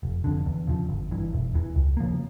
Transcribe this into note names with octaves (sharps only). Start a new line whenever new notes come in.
F1
F2 D3
E2
C#3 F3
G1
G2 E3
E1
E2 E3
C#2
C#3 F3 A#3